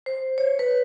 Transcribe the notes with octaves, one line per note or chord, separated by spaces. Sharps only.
C5
C#5
B4